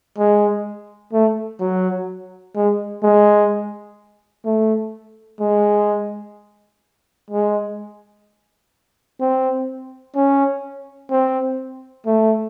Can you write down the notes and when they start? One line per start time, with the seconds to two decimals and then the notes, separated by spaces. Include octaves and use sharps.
0.18 G#3
1.13 A3
1.60 F#3
2.56 G#3
3.03 G#3
4.45 A3
5.40 G#3
7.30 G#3
9.21 C4
10.16 C#4
11.11 C4
12.06 A3